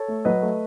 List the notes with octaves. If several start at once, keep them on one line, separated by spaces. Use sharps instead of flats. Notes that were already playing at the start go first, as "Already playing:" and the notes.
Already playing: A4 C#5
A3
F#3 B4 D#5
A3